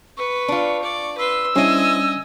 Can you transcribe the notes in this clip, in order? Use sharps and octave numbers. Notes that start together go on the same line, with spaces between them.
B4 C#6
D4 F4
D5
B4 C6 E6
G3 C#4 D4 E4 C5 D#5 G#5